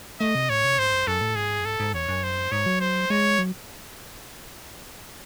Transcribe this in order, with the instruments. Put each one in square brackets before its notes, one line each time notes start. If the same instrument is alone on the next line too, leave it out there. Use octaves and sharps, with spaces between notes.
[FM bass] A3 [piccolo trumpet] D#5
[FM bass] C3
[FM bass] A2 [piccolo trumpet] C#5
[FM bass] C3
[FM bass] G#2 [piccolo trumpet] C5
[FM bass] F#2
[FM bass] F#2 [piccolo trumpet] A4
[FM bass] A2
[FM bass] G#2 [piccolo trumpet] G#4
[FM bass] F#2
[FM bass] G#2 [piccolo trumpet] A4
[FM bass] G#2
[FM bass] E2 [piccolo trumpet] C#5
[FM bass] F#2
[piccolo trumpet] C5
[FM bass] G#2 [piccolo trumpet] C#5
[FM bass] F#3
[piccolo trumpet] C5
[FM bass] G#3 [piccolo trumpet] C#5
[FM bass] F#3